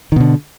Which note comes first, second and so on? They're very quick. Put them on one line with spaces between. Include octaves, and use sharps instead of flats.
D#3 B2 D3